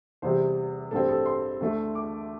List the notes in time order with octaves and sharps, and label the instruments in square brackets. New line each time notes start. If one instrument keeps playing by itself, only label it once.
[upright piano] E2 C3 G3 C5
A1 G2 G3 C4 A4
A4
C6
D2 D3 A3
D6